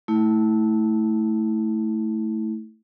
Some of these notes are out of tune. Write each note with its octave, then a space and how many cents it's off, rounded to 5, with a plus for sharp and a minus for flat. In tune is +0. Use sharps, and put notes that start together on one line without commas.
A3 +0 E4 -20